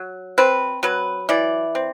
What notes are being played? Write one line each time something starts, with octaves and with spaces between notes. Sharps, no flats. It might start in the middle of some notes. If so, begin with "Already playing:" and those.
Already playing: F#3
C4 B4
F#3 B4
E3 D5
C4